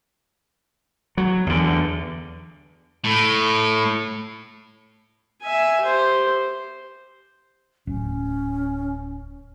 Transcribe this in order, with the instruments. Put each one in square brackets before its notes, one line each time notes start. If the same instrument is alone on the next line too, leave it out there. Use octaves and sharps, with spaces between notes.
[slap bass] F#3
E2 D3
[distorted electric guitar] A2
[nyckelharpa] E5 G#5
G4 C5
[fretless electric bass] D1 [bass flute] C#4